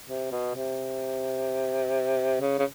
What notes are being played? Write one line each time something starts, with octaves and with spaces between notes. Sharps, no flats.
C3
B2
C3
C#3
C#3